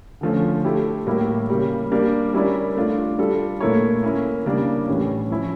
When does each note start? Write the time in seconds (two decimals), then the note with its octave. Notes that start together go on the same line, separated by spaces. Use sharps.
0.21 D3 F3 A3 C#4 F4
0.64 A3 E4 G4
1.06 A2 G3 A#3 E4 G4
1.49 C#3 G3 A#3
1.92 G3 A#3 D4
2.34 G3 C#4 E4 A#4 D5
2.76 A3 D4 F4
3.19 G3 D4 F4 A4
3.61 A#2 A3 E4 A#4 C#5
4.03 A#3 C#4 E4 A#4
4.46 C#3 G3 A#3 D4
4.88 A2 E3 G3 C#4
5.31 F3 C#4 E4